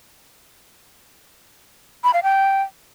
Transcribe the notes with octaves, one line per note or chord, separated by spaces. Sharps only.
B5
F5
G5